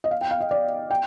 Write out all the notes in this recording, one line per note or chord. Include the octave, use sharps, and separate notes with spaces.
D#5
F5
G5
F5
D#5
D5
G5